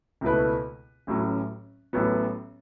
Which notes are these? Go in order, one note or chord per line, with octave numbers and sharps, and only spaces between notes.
C#2 B2 A3 E4 B4
A1 A2 F#3 C#4
A1 A2 F#3 B3